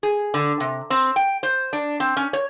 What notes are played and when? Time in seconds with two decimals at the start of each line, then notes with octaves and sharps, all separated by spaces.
0.03 G#4
0.34 D3
0.60 C3
0.90 C4
1.16 G5
1.43 C5
1.73 D4
2.00 C4
2.17 C#4
2.33 C#5